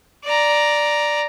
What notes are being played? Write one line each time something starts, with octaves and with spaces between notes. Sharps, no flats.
D5 A#5